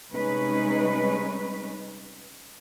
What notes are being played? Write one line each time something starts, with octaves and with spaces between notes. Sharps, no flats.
C3 G3 G#3 C#4 D#4 B4